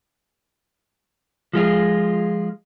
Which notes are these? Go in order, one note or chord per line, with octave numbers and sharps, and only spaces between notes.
F3 G#3 F4 G#4